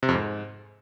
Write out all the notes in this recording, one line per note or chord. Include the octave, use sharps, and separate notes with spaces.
C3
F2
G#2